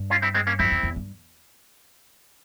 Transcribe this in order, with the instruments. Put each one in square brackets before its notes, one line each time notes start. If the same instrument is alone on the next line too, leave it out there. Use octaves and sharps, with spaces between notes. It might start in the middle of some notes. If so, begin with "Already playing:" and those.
Already playing: [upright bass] G2
[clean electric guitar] C#4 F4
C4 E4
G#3 C4
A#3 C#4
[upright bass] F2 [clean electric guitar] C4 E4
[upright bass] E2
E2
G2